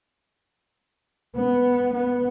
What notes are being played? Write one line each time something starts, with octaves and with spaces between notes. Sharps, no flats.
B3
B3